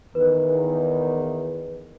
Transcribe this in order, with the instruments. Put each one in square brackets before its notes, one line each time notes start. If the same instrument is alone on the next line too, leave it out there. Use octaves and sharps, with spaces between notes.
[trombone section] E2 D#3 [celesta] B4